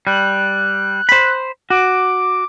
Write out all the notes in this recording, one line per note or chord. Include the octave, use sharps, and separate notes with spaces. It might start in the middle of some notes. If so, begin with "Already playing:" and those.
G3 F#6
C5 B5
F#4 D6